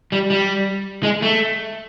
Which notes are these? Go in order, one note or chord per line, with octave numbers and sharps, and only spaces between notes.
G3
G3
G#3
A3